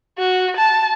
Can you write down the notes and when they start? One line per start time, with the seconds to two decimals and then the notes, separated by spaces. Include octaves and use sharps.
0.18 F#4
0.57 A5